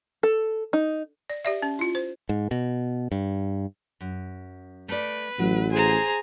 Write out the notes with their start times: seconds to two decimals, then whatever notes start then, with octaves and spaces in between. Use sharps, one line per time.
0.23 A4
0.73 D#4
1.30 D5
1.45 G4 D5 E5
1.62 C#4
1.79 E4 F4
1.95 C5
2.29 G#2
2.51 B2
3.12 G2
4.00 F#2
4.89 A3 B4 D5
5.39 A1 F#3
5.72 G#4 C5 G#5 A#5